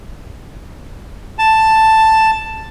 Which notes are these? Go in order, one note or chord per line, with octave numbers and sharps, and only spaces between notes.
A5